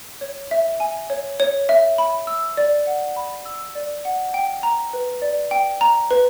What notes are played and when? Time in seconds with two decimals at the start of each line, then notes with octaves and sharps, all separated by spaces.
0.21 C#5
0.51 E5
0.80 G#5
1.10 C#5
1.40 C#5
1.69 E5
1.98 B5
2.27 E6
2.57 D5
2.87 F#5
3.16 B5
3.46 E6
3.75 D5
4.05 F#5
4.34 G5
4.63 A#5
4.93 B4
5.22 D5
5.51 G5
5.81 A#5
6.11 B4